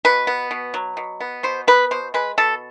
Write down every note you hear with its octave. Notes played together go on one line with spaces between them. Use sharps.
B2 B4
B3
B2
F#3
B2
B3
B2 C5
B3 B4
B2 C5
G#3 B4
B2 A4